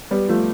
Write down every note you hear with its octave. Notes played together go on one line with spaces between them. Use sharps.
G3 B3
F3 A3